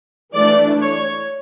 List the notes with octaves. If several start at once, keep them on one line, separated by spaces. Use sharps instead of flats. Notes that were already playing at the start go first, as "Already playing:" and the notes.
E3 A3 D4 D5
C#5